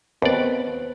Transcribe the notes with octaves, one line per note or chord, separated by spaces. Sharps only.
D#2 B3 C4 B4 D5